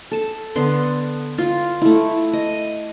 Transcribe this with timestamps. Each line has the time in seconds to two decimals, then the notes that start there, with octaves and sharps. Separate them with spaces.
0.11 A4 A5
0.55 D3 B3 C6
1.38 F4
1.81 A3 E4
2.33 D#5